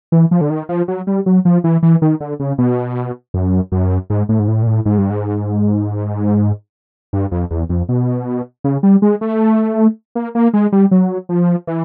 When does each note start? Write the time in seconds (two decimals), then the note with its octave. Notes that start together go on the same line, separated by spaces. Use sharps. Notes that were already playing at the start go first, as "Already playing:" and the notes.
0.12 E3
0.31 F3
0.41 D3
0.50 D#3
0.69 F3
0.88 F#3
1.07 G3
1.26 F#3
1.45 F3
1.64 E3
1.83 E3
2.02 D#3
2.20 D3
2.40 C#3
2.58 B2
3.34 F#2
3.72 F#2
4.10 G#2
4.29 A2
4.39 G#2
4.48 A2
4.62 A#2
4.67 A2
4.85 G#2
4.98 G2
5.10 G#2
7.13 G2
7.31 F2
7.51 E2
7.69 F2
7.89 B2
8.64 C#3
8.83 G3
9.02 G#3
9.21 A3
10.15 A#3
10.35 A#3
10.53 G#3
10.72 G3
10.91 F#3
11.29 F3
11.67 E3